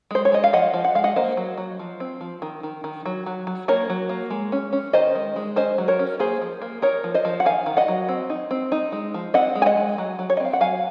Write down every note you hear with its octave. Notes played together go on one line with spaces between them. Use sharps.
G#3 C5
C#5
G#3 D#5
F5
F3 D#5 F#5
F3
F#5
G#3 F5
D#5 F#5
A#3 C5 D#5
F#3
F#3
F3
C4
F3
D#3
D#3
D#3
F#3
F#3
F#3
A#3 A#4 C#5
F#3
A#3
G#3
C#4
C#4
D#3 C5 D#5
G#3
G#3
C#4 C5 D#5
F#3
A#4 C#5
C#4
A#3 G#4 C5
F3
A#3
D#4 A#4 C#5
F3
C5 D#5
F3
F#5
D#3 F5 G#5
D#3
D#5 F#5
F#3
C4
D#4
C4
D#4
G#3
F3
C4 D#5 F#5
G#3
G#5
D#5 F#5
G#3
F#3
F#3
C#5
D#5
C4 F5
F#5
F#3 F5 G#5